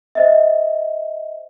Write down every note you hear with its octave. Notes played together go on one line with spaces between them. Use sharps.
C5 D#5 E5